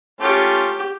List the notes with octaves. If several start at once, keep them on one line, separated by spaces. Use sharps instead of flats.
A3 C#4 F4 G4